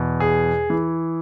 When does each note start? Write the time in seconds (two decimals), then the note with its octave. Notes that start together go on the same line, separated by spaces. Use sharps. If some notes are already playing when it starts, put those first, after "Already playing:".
Already playing: E2 B2
0.20 G#4
0.70 E3